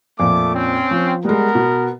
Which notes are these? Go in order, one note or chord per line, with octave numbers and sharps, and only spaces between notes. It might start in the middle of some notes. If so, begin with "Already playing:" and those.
F2 A#2 A3 D6
C4 C#4
F3
G3 G#3 B3 A#4
B2